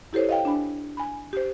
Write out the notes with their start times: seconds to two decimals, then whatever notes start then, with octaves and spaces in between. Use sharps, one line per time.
0.13 E4 G4 A4 C5 C#5
0.29 D#5 F5 G5
0.45 D4 G#5 B5
0.97 G#5 B5
1.33 G4 C5